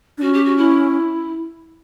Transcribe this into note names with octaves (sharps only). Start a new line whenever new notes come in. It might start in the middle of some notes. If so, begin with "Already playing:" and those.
D4
C#4 F#4
G4
F#4
E4